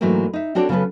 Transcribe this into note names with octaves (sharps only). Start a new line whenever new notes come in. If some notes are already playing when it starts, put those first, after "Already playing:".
G#2 E3 F#3 A3 A#3 C4
D#4 E5
C4 D4 F#4 A4 C#5 D5
C#3 F#3 B3 C#4 A4 B4